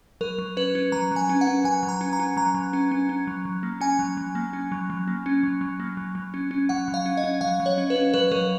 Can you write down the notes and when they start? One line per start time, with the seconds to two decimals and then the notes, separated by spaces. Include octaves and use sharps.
0.21 F#3 A#4
0.38 F#3
0.57 C#4 B4
0.75 C#4
0.92 F#3 A#5
1.11 F#3 G#5
1.29 C#4
1.41 F#5
1.47 C#4
1.64 F#3 G#5
1.83 F#3
1.89 A#5
2.01 C#4
2.13 A#5
2.20 C#4
2.37 F#3 A#5
2.55 F#3
2.73 C#4
2.91 C#4
3.09 C#4
3.27 F#3
3.45 F#3
3.63 A#3
3.81 C#4 G#5
3.99 F#3
4.17 F#3
4.35 A#3
4.53 C#4
4.72 F#3
4.90 F#3
5.08 A#3
5.26 C#4
5.43 F#3
5.61 F#3
5.80 A#3
5.97 F#3
6.15 F#3
6.34 C#4
6.51 C#4
6.69 F#3 F#5
6.88 F#3
6.94 F5
7.06 C#4
7.17 D#5
7.24 C#4
7.41 F#3 F5
7.60 F#3
7.66 C#5
7.78 C#4
7.90 B4
7.96 C#4
8.14 F#3 B4
8.31 F#3 A#4